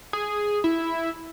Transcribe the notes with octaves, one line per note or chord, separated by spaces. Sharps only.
G#4
E4